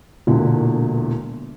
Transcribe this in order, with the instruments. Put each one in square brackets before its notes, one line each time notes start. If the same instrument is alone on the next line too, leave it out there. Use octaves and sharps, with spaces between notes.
[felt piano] E1 E2 A#2 D3